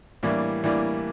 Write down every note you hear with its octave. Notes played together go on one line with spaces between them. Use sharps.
A2 E3 G3 A#3 D4
A2 E3 G3 A#3 D4